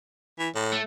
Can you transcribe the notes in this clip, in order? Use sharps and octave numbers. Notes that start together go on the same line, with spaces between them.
E3
A2
A3